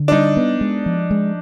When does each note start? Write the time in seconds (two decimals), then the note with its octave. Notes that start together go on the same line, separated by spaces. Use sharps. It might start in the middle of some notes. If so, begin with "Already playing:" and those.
Already playing: D3
0.08 D4
0.12 G3 D#4
0.37 B3
0.61 G#3
0.86 F3
1.11 G#3